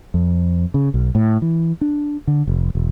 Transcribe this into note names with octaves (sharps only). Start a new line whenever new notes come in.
F2
C#3
B1
A2
E3
D4
D3
F1
E1